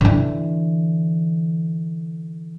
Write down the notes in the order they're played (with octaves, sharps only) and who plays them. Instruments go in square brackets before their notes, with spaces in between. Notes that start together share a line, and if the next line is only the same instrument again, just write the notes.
[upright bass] D3 E3